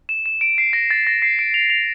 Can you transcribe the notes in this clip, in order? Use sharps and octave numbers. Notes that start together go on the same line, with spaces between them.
E7
E7
D7
C7
A#6
A6
A#6
C7
D7
F7
F7